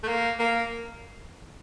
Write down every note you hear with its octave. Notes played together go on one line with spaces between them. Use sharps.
A3
A#3
A#3